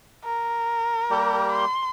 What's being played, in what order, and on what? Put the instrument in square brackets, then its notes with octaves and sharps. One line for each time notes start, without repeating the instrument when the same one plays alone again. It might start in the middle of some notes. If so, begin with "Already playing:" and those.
[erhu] A#4
[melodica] G3 A#3 G4
[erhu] C6